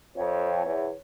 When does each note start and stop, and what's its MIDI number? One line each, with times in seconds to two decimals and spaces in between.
0.16 0.60 41
0.16 1.01 73
0.64 0.88 40